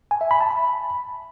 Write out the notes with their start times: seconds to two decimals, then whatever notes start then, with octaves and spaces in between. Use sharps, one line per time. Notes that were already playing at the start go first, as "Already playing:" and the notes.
0.11 G#5
0.21 E5
0.31 B5
0.41 A5
0.51 B5